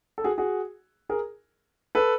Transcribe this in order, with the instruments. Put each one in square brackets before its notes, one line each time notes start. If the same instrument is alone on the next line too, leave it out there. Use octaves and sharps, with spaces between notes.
[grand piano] A4
F#4 G#4
F#4 G#4
G#4 A#4
A4 B4